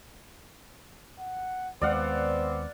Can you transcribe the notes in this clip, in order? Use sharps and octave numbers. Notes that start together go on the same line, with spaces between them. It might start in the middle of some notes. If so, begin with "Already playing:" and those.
F#5
D#2 G#3 B3 C4 D5 F5 F#5